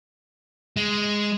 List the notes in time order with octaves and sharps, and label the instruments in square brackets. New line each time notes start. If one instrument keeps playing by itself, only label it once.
[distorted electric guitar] G#3